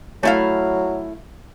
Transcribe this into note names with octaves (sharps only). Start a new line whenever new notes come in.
F#3 A3 E4 F5